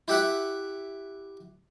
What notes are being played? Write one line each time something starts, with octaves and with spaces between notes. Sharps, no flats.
E4 G4 E5 F#5